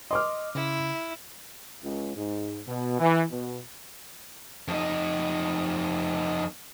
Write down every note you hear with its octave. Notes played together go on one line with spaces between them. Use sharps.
D#5 C6 D6 F6
C#3 E4
C#2
G#2
B2
E3
B2
F2 D#4